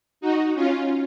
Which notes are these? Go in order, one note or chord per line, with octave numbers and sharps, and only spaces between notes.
D#4 F#4
C#4 F4